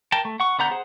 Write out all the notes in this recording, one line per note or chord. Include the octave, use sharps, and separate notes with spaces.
A#4 G5 A5
A3
F#5 C#6
D3 B3 F#5 A#5 G6
G#4 C5 F#5